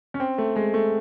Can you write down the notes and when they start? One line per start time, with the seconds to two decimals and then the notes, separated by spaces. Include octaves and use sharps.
0.14 C#4
0.20 C4
0.38 A3
0.56 G#3
0.74 A3